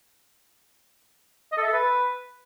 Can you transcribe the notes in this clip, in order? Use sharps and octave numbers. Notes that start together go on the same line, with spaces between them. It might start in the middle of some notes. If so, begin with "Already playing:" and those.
D#5
A4
E5
A4
B4